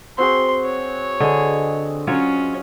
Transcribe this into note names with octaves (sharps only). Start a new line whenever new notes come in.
C4 F#4 G#4 C6
C#5
D3 G#4 D#5
F#3 C#4 F4 C#5